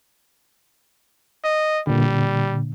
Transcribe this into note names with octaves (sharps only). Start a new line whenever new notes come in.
D#5
A#2 D3 G3